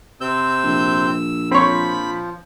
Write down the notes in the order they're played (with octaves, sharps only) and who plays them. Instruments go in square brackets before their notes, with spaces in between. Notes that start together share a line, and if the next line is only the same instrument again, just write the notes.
[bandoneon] C3 C4 G6 [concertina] E6
[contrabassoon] A#1
[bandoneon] F3 [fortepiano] C4 C#5 [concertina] B5